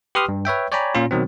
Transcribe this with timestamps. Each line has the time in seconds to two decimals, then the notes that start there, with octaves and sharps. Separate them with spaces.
0.15 G4 B4 C6 D#6 F6
0.29 G2
0.45 B4 C#5 E5 G5
0.72 C#5 D5 G5 G#5 A#5 B5
0.95 A#2 C#4 F4
1.11 B2 D#3 F#3 C4